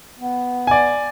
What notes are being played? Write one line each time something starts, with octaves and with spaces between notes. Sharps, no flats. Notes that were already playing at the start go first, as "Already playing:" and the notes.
B3
D5 G#5